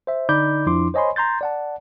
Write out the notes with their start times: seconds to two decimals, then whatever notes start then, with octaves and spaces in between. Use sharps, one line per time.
0.07 C5 E5
0.29 D3 D#4 D5 B5 D6 G6
0.66 F2 F3 D4 E4 C6 D6
0.94 C5 C#5 D#5 G#5 B5 C6
1.16 A#5 C6 G6 A6
1.41 D5 F#5 A5